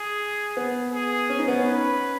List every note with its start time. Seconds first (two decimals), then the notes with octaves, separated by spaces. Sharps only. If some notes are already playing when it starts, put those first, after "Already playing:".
Already playing: G#4
0.57 B3
0.93 G#4
1.30 C#4
1.39 D#4
1.48 B3
1.58 C#4
1.67 B4